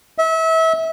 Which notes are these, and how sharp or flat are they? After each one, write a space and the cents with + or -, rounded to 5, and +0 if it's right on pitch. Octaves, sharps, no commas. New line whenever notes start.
E5 -30